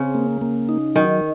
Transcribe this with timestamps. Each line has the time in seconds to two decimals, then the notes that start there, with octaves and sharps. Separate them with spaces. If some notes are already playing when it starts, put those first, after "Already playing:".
Already playing: C#3 C4
0.15 A#3
0.42 A#3
0.69 D#4
0.95 D#3 F#3